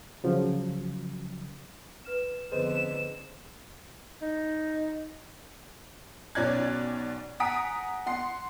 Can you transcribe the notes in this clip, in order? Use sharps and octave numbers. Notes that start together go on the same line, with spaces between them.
C#3 F3 F#3
B4 F6 E7
F2 D3 B3 G#4 B4 C5 D#5 E7
D#4
B1 B2 C#4 D5 F#6 G#6
F#5 G#5 A#5 D#6 B6 D7
F#5 C6 C7